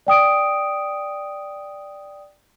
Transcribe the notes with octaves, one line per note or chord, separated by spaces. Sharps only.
D5 G5 D#6 D7